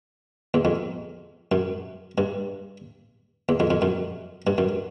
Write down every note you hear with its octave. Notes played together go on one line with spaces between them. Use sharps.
E2
F2
F#2
G2
E2
F2
F2
F#2
G2
F#2